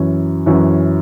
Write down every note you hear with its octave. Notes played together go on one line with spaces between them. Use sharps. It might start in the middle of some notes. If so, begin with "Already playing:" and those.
Already playing: F#2 E3 C#4
F#2 E3 C#4